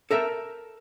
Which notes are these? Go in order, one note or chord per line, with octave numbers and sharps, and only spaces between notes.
A4 A#4 E5